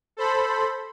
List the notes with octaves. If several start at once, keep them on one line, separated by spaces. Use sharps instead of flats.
A4 C5 B5